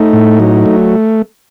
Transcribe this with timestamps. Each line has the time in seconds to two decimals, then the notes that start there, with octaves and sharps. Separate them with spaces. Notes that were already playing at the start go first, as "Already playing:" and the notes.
Already playing: A3 D#4
0.13 A2
0.40 F#3
0.66 A3